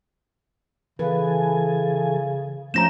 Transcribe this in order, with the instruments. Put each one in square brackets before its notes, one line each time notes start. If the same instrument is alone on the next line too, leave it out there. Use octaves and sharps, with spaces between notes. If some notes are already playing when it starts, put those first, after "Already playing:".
[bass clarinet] C#3 [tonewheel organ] E3 A4 G#5 [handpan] B4
[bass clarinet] F3 [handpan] A3 C#4 F4 [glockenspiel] A#5 A#6 E7 [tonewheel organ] G6